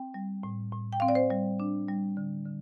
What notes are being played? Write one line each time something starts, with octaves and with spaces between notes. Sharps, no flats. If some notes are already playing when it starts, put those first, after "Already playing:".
Already playing: C4 G5
G3
A2
A2
G5
C4 F5
D5
C5
G3
D4
G3
D3
D3